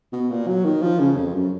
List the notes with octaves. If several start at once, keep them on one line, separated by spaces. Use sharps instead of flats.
B2
A#2
F#3
D#3
F3
C#3
F2
F#2